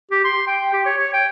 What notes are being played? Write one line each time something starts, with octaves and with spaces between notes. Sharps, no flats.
G4
C6
G5
G4
C#5
C#5
G5